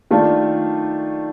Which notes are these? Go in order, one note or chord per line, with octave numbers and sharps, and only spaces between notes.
D#3 A3 D4 F4